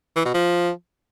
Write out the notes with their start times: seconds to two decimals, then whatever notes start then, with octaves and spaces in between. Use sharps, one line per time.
0.16 E3
0.25 B2
0.34 F3